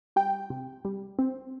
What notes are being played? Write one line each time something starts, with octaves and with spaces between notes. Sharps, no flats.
G3 G5
C3
G3
C4